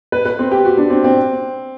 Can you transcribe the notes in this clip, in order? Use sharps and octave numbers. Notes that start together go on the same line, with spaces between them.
B4
B4
C4
G4
F#4
D4
C4
C4